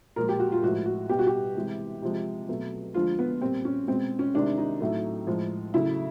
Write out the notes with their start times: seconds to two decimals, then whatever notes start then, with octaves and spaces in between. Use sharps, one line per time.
0.16 A#2 F3 G#3 A#4
0.29 G4
0.39 F#4
0.52 F4
0.62 A2 F3 G#3 F#4
0.85 F#4
1.09 B2 G3 G4
1.19 F#4
1.27 G4
1.55 C3 E3 G#3
2.02 C3 F3 G#3
2.49 B2 F#3 A3
2.94 D3 F3 G#3 F4
3.19 B3
3.41 A#2 G3 C4
3.65 C#4
3.88 B2 G#3 C4
4.19 C#4
4.34 C3 D#3 G#3 D4
4.58 D#4
4.80 A2 F#3 A3
5.27 A2 F3 G#3
5.74 C#3 F#3 A3 E4